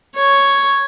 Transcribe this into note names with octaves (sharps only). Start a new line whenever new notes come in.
C#5